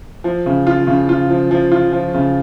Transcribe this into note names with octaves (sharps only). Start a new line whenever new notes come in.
F3
C#3
F4
C#3
F4
F3
F3
F4
F3
C#3